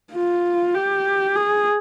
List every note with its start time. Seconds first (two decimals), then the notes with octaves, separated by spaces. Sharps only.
0.13 F4
0.74 G4
1.35 G#4